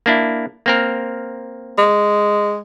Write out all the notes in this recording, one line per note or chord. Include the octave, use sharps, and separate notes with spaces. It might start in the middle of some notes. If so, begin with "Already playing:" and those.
A#3 D4 E4
A#3 C4 A#4
G#3